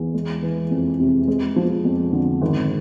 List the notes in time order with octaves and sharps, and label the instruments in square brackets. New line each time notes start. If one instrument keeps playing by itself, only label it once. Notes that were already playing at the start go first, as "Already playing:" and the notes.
Already playing: [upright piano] E2
G#3
E3
F2
C3
G#3
F3
F2
D3
G#1